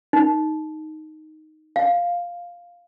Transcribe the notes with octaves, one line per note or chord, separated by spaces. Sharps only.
D#4
F5